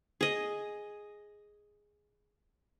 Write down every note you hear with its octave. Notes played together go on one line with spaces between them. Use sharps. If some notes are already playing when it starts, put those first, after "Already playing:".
G#4 D#5